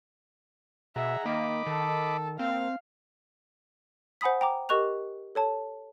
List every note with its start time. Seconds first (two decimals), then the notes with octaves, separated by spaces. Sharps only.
0.96 B2 G#4 E5 F#5 A#5
1.26 D#3 A#3 D#5 B5 D6
1.67 D#3 A4
2.39 A#3 C4 F5
4.21 C5 F#5 G#5 B5 D#6 B6
4.41 G5 A#5 D6
4.69 G4 A#4 D#5 C#6 F#6 F7
5.35 A4 C#5 A5